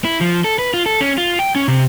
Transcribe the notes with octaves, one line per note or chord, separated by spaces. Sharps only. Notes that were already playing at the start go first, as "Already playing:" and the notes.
E4
F3
A4
B4
F4
A4
C#4
F4
G5
C#4
C3